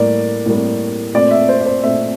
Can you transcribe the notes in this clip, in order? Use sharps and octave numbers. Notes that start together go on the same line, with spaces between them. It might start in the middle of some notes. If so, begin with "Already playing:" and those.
Already playing: A2 G3 A#3 D5
A2 G3 A#3
A#2 A3 C4 D5
E5
C5
D5
C5
A#2 A3 C4 E5